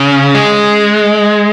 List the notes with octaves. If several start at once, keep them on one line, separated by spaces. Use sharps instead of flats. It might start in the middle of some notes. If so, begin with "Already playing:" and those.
Already playing: C#3
G#3